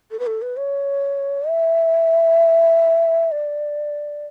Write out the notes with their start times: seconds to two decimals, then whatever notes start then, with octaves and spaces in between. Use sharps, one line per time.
0.11 A4
0.19 B4
0.27 A4
0.42 B4
0.57 C#5
1.48 E5
3.32 D5